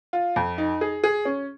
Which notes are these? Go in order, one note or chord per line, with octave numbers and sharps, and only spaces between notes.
F4
F2
D#4
G#4
G#4
C#4